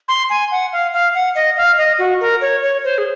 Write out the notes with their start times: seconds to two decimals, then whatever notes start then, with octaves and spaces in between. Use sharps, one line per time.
0.08 C6
0.30 G#5
0.51 F#5
0.73 F5
0.94 F5
1.15 F#5
1.35 D#5
1.57 F5
1.78 D#5
1.99 F#4
2.21 A#4
2.41 C#5
2.63 C#5
2.84 C5
2.98 G#4